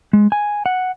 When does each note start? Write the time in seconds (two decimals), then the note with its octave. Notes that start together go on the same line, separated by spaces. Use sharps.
0.13 G#3
0.32 G#5
0.66 F#5